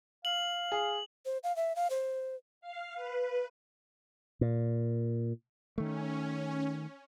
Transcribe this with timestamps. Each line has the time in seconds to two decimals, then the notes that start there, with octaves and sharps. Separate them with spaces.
0.25 F5 F#7
0.72 G#4
1.25 C5
1.44 F5
1.56 E5
1.76 F5
1.90 C5
2.61 F5
2.95 B4
4.41 A#2
5.78 D#3 A3 C#4